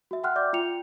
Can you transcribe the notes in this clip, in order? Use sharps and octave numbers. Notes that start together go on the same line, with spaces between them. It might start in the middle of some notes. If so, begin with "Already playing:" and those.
F#4 E5
F#5 G5 C6 F6 F#6
D5 E5 D6 G6
F4 G5 C#7 F7